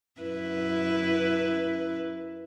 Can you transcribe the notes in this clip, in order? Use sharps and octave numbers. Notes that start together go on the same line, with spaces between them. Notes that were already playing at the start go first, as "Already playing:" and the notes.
F#2 E4 B4